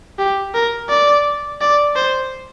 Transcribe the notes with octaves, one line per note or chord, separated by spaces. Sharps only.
G4
A#4
D5
D5
C5